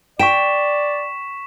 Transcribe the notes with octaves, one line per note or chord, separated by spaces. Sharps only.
D5 G5 C#6 B6 E7